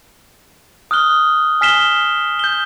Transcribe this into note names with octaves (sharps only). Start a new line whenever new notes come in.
D#6 F6 F#6 G7
G#5 F6 B6 C7 E7 G7
G6 G7